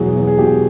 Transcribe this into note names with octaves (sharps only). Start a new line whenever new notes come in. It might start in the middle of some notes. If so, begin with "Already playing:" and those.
Already playing: E2 B2 F#3 G#4
E2
G#4
B2 G4